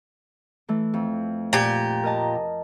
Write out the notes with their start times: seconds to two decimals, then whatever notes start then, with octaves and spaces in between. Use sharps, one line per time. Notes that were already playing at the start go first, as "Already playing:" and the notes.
0.69 E3 A3
0.94 F2
1.53 A#2 G4
2.03 A#4 D#5 A5